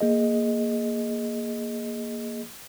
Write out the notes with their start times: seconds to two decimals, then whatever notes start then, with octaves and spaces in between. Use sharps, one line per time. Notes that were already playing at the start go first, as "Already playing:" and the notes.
0.01 A#3 G#4 D#5